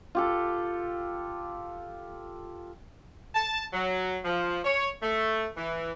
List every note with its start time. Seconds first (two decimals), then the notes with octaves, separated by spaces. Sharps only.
0.15 F4 G4 A4
3.35 A5
3.73 F#3
4.25 F3
4.65 C#5
5.03 A3
5.57 E3